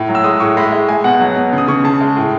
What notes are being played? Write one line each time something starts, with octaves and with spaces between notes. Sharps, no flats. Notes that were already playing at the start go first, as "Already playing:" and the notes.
Already playing: A2
F#3
E6
G#3 D#6
A2 C#6
G#3 B5
G#3
G#3 G#5
B2 F#5
F#3
B2
C#3
D#6
C#3 C#6
C#3 A5
G#3
A2